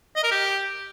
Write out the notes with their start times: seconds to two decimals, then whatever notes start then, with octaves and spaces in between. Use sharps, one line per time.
0.16 D#5
0.23 A#4
0.31 G4